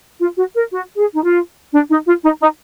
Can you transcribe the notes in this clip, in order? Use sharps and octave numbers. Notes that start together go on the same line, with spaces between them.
F4
F#4
A#4
F#4
G#4
D#4
F4
D4
D#4
F4
D#4
D#4